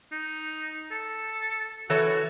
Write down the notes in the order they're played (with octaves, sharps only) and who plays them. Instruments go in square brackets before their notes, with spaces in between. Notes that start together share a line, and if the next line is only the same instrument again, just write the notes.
[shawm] D#4
A4
[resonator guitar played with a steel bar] E3 A4 C#5 [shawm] F#4